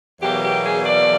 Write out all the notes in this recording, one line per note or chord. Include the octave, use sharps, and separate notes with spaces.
E2 B2 F#3 A#3 G4
G4
G#4
D5